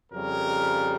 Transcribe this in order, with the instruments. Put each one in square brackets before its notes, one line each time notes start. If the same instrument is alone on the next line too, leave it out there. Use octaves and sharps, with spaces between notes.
[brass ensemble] F2 C#3 G3 A#4